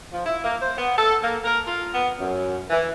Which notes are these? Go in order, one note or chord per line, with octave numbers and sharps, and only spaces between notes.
F3
E4
A#3
C5
B3
A4
A#3
A#4
F4
B3
F#2
E3